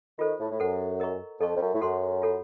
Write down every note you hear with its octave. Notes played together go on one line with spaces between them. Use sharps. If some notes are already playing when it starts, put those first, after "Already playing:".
D#3 F4 A4 C5
A2
A2
F#2 A4 C5 F#5
A#4 D#5 A#5 C#6
F2 A4 D#5 A5 C#6
F2
F#2
A2
F#2 F#4 A4 C5 F#5 C6
F4 A4 C#5 F#5